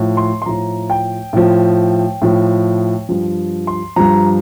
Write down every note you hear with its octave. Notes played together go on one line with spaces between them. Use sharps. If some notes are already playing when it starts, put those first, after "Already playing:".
Already playing: A2 F3
C6
C6
A2 F3 A#5
G5
A2 F3
A2 F3
G2 F3
C6
G2 F3 A#5